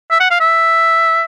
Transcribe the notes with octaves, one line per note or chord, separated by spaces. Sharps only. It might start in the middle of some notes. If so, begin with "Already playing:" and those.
E5
F#5
F5
E5